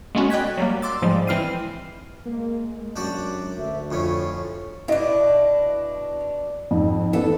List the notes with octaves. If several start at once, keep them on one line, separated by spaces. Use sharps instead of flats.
G#3 A3 B3 C#4 F#4
D5 D#5 G5 F#6 G#6 B6
F#3 G3 A#3
C6 D6 E6 A6
G#2 F3 G3 G#3
E3 C4 E4 F6 C7 D#7
G#3 A#3
F#2 D4 F#4 G4
D2 E5
F2 A2 C#4 F4
B2 D4 E4 D#5
F2 G#2
E3 B3 D#4 A4